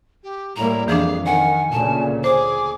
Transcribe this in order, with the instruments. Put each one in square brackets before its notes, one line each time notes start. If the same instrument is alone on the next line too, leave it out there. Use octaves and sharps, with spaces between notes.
[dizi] G4
[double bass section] A2 G3 A#3 [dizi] E4 [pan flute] A#5
[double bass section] F2 [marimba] E3 F3 D4 [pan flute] G#4 [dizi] F5
[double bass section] D#3 [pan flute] F#5 [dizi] G#5
[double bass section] D2 A#2 C#3 [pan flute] A5
[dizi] G#4 [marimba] C5 [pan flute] D6